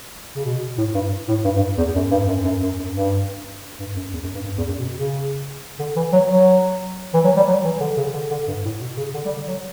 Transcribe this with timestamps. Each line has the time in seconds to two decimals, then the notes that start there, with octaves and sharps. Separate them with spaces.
0.35 C#3
0.44 B2
0.78 A2
0.94 G2
1.28 A2
1.45 G2
1.56 G2
1.78 E2
1.96 F#2
2.11 G2
2.28 F#2
2.45 F#2
2.62 F#2
2.79 F#2
2.95 G2
3.80 G2
3.96 F#2
4.13 E2
4.23 F#2
4.34 G2
4.45 G2
4.57 E2
4.69 F#2
4.79 B2
4.97 C#3
5.79 D3
5.96 E3
6.13 F#3
6.29 F#3
7.14 E3
7.24 F#3
7.36 G3
7.48 F#3
7.64 E3
7.80 D3
7.97 C#3
8.13 D3
8.31 D3
8.47 G2
8.65 A2
8.81 B2
8.97 C#3
9.14 D3
9.25 G3
9.37 D3
9.47 F#3